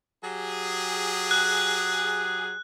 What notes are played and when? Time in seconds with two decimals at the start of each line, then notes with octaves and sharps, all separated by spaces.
0.24 F#3 G4 G#4
1.31 F#6